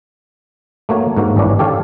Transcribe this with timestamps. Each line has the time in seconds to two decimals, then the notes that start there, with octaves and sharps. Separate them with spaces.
0.89 A3 A#3 F#4 C#5
1.17 G#2 A#3 F#4
1.36 G#1 G2 C#4 D4 E4
1.59 G4 A4 C#5 F5